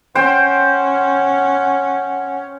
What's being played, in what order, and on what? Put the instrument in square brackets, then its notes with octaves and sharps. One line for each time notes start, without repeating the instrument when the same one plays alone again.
[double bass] C#4 [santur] C5 G5 [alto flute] F#5